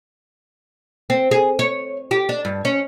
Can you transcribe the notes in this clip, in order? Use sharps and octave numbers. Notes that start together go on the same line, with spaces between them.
C4
G#4
C#5
G4
D4
G2
C#4